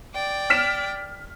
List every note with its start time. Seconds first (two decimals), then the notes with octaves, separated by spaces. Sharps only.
0.14 D5 G5
0.50 F6 B6 E7